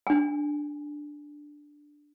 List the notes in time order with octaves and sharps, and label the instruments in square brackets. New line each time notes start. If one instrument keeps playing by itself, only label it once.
[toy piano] D4 G#5